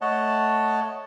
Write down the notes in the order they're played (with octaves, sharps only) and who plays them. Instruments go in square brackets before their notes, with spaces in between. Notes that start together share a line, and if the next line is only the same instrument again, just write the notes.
[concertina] A3 C#5 D#5 F#5 A5